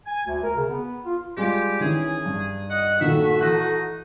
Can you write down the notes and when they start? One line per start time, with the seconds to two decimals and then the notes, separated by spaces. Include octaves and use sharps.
0.06 G#5
0.26 D2
0.43 A#4
0.56 C#3
0.68 B3
1.05 F4
1.37 G3 G#3 F4 G4
1.80 D#3 E3 C#4 E4 G#4
2.25 G2
2.70 D#5 F#5
3.00 A#2 D#3 F#4 A4 E5
3.41 E3 D#4 F#6